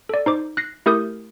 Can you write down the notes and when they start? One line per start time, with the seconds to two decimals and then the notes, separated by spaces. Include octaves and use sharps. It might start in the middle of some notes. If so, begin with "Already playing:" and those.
0.09 A4 D5
0.26 D#4 C5 D6
0.57 F#6 A#6 C7
0.86 A3 E4 G4 A#4 D#6 G6